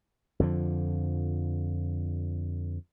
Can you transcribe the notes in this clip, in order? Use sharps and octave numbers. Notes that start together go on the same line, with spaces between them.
F2 D3 F3